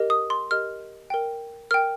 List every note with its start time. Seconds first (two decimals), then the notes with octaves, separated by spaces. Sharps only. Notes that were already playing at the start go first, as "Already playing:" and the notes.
Already playing: G4 A#4 D#5
0.10 D#6
0.30 C6
0.51 G4 A#4 D#5 F6
1.10 A#4 G5
1.71 A#4 G5 F6